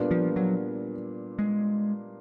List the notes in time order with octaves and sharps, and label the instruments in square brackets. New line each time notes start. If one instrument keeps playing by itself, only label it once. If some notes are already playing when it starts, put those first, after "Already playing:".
Already playing: [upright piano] A#2 G3 B3 D4
[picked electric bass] F3
F#3
G#3